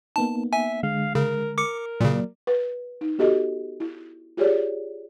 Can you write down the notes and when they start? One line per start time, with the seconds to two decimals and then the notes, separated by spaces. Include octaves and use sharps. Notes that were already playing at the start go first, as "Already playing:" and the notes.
0.16 A#3 B3 D#4 A5
0.53 E5 G#5
0.83 D3 G#3 F5
1.15 C#3 A#4
1.58 A#4 D6 C#7
2.01 A#2 C#3 F#3 A#3 D5
2.47 B4
3.01 D#4
3.18 B3 F#4 G4 A4 D#5
3.80 E4
4.37 F4 G4 G#4 C#5 D5